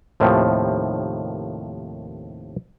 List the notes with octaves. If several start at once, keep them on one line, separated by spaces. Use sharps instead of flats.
D#2 A2 C3 D#3 F3